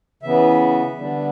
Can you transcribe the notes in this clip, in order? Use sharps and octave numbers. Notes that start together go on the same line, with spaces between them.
C#3 E3 B3 E5
D3 G3 B3 D4